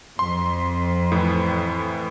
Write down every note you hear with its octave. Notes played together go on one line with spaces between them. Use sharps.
F2 C6
A2 E3